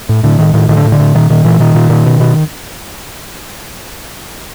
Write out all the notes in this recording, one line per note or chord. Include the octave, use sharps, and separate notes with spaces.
A2
A2 D3
A2 D#3
A2 D#3
A2 D#3
D3
A2
D3
A2
A#2 D#3
A#2 D#3
A#2 E3
A#2 D#3
A#2
A#2
B2
B2